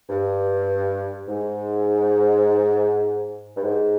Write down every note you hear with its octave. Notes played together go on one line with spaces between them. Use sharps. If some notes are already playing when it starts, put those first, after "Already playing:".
G2
G#2
G2
G#2